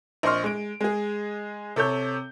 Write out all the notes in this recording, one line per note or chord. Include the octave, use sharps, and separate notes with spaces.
A#1 C5 D#5 C6 C#6 F6
G#3 D7
G#3 G#4
C3 A4 C#5 G6